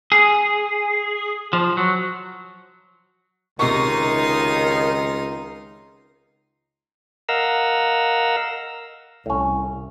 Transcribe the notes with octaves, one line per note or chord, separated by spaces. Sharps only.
G#4
F3
F#3
C#2 C3 D#3 D#4 C6 C#6
A#4 D#5 F5 F#5 A#5 E6
C2 A2 C#4